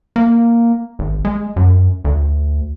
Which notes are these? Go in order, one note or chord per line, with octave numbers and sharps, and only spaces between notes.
A#3
G#1
G#3
F#2
D2